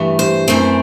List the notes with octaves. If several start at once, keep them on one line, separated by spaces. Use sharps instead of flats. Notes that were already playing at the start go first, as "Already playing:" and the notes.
Already playing: G2 E3 A3
C5
F#2 E3 A3 C4